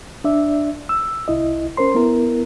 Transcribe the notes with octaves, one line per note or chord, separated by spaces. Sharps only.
D4 D5 E5
E6
C2 E4 D#5
C#4 A#4 C5 C6
B3 E4 A#4